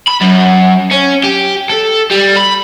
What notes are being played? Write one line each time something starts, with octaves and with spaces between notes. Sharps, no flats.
B5
F#2
C#4
G4
A4
G3
B5